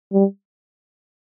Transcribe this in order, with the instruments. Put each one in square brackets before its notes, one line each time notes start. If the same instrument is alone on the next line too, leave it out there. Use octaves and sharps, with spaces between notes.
[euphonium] G3